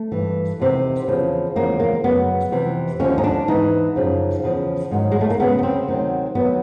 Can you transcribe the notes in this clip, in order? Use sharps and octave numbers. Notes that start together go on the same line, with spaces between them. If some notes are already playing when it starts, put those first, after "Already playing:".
Already playing: A3
G2 E3
E2 C3 D#3
E2 C#3 F3
E2 C#3 F3 A#3
A#3
F#2 C#3 F#3 B3
F2 C3 E3
D#2 D3 F3 C#4
D#4
D4
G#2 E3 D#4
F#2 C#3 F3
E2 C#3 F3
G#2 D#3 F#3
G#3
A3
A#3
D2 C#3 F#3 B3
B3
C4
D2 C3 D#3 F#3
D#3 F#3 B3